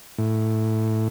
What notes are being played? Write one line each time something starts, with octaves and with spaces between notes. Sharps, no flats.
A2